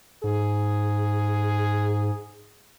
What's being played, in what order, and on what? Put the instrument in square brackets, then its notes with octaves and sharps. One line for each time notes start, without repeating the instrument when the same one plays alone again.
[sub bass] G#2 [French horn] G#4